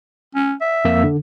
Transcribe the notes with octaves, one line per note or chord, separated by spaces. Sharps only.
C#4
E5
F2 A#3 E6
D3